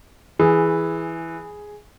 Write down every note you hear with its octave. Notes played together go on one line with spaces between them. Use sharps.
E3 G#4